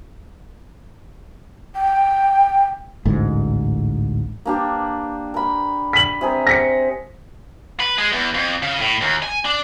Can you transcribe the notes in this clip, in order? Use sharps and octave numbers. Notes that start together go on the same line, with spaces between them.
G5
A1 D2 G#2
A#3 D4 G4
A#4 B5
B6 F#7
C3 G#4 A#4
A#6 B6 C#7
B4
G#3
E2
F2
C#3
A2
D#2
G#5
D4